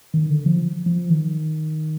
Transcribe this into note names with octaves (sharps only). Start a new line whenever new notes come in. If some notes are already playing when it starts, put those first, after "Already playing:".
D#3
D3
F3
F3
D#3